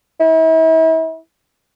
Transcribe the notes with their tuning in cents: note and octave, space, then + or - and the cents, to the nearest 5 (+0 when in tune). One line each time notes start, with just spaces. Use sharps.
E4 -40